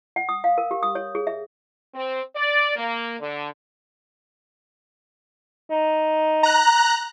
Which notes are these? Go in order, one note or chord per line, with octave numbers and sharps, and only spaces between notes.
F#5
D#6
F5
A#4
G4
D#6
C#5
G#4
E5
C4
D5
A#3
D3
D#4
A#5 F#6